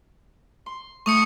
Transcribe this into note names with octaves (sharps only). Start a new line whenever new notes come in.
C6
A3 C#6 D#6 C#7